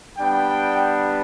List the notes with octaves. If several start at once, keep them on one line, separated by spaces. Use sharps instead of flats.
G3 B3 D4 G5